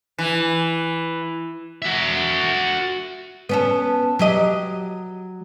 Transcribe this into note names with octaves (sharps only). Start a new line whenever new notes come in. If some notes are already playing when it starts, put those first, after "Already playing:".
E3
F#4 E5
B3 C#4 A4
F#3 G4 D#5